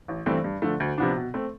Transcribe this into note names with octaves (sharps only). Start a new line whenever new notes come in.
A1
G2 E3 A3 C4
G2
D3 F3 A3
D2
C3 F3 B3 D4
B2
A3 C4